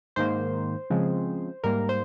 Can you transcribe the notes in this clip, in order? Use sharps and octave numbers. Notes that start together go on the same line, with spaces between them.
G#2 D#3 A#3 C5
C#3 F3 G#3 C4
G#2 G3 A#3 A#4
C5